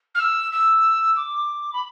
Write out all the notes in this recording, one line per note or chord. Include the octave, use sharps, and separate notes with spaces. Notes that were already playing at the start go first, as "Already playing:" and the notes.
F6
E6
E6
D6
B5